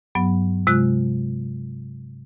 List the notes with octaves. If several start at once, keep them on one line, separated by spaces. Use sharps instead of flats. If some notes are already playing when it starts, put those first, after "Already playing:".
G2 F#3 B3
C3 G#3 F4 F#6